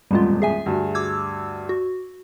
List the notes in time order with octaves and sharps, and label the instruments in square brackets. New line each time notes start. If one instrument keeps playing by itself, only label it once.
[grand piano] D#1 A1 F2 [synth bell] G3 G#3 F4
[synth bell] G#4 E5 G#5
[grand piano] D2 G2 F#4
[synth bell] D6 E6 G#6
F#4